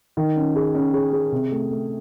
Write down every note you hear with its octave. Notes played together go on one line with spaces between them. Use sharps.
D#3
C#4
G#4
C#4
G#4
G#4
C3
A3
A3